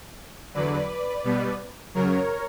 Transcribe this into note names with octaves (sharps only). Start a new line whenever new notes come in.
E2 D3 F#3 B4 D5
B2 G3 B3
F#2 C#3 F#3 A#4 C#5